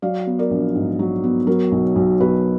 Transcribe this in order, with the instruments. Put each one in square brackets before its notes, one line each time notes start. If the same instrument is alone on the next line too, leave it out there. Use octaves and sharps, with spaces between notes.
[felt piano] F#3 D5 F5
B3
A#4 D5
A#1
G#2
F#3
B3
F#3 A#4
B1
B1
B2 B4